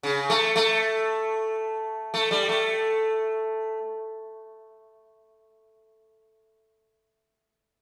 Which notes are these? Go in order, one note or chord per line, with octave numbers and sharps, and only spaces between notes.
C#3
A3
A3
A3
G3
A3